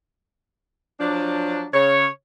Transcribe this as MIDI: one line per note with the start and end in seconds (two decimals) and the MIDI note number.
1.00 1.65 53
1.00 1.65 54
1.00 1.65 62
1.74 2.06 49
1.74 2.06 73